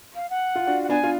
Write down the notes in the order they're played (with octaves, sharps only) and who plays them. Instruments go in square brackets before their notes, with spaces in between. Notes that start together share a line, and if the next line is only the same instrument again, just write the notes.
[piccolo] F5
F#5
[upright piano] F4
D4 F#4
[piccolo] F#5
[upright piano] B3 D4 [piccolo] G#5
[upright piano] F4